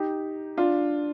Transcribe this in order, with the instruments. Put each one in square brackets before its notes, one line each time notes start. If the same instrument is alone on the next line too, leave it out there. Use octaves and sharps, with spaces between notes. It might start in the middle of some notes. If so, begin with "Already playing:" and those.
Already playing: [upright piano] D#4 G4
D4 F4